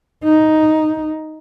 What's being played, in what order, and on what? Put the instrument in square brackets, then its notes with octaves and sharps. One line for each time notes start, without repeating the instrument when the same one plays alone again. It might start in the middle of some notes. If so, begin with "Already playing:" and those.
[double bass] D#4